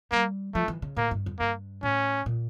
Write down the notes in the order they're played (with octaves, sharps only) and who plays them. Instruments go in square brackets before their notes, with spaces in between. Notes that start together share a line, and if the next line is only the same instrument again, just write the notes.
[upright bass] G3 [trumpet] A#3
[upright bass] F3 [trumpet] A3
[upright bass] E3
C#3
[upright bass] A2 [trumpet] A#3
[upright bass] G2
F2
[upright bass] G2 [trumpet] A#3
[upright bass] A2 [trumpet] C#4
[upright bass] A#2